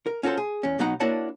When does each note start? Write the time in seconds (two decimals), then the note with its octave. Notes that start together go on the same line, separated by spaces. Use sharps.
0.06 A#4
0.23 C#4 F4 F#4 A4 C5
0.37 G#4
0.63 E2 C#4
0.79 B1 F#3 B3 D#4 F#5 A#5
1.00 A#3 D4 E4 F#4 C#5 A5